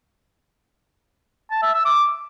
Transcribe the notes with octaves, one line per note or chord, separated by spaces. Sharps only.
A5
E5
E6
D6